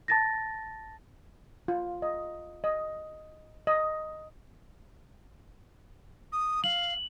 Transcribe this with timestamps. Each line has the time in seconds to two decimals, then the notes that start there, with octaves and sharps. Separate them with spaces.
0.08 A5 A6 A#6
1.68 F4
2.02 D#5
2.64 D#5
3.67 D#5
6.32 D#6
6.64 F5 F#7